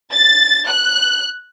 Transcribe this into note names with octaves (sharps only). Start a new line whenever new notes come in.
A6
F#6